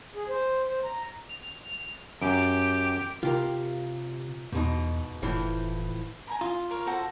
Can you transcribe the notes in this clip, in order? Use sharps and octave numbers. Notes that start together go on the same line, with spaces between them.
G#4
C5
C5
A#5
F7
F#2 G4 D7
C3 F4 G4 A#4
E2 G#2 B2 D#4
F1 A2 E3 F3
G#5 A#5 B5
F4 D#6
A#4 C#5 F5
F#4 A4 C5